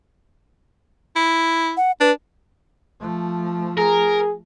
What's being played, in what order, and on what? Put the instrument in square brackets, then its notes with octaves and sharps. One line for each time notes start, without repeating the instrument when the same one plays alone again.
[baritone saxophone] E4
[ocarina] F#5
[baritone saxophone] D4 [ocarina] B4
[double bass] F3 A3
[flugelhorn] G#4 [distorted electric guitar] A#4